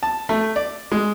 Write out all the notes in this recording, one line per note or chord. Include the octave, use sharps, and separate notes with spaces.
A5
A3
D5
G#3